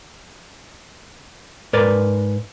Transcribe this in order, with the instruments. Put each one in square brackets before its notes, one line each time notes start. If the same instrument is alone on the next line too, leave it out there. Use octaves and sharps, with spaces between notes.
[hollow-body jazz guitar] G#2 A#4 B4 D5